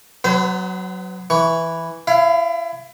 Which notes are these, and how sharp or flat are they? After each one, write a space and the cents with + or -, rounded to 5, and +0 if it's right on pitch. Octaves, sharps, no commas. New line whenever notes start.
F#3 +0 B3 +35 C5 -30
E3 +0 C#6 +15
E4 +30 F5 -5